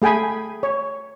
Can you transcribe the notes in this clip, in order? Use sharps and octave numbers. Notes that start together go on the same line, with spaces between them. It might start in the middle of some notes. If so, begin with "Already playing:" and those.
A3 G#4 G5 G#5 B5
C#5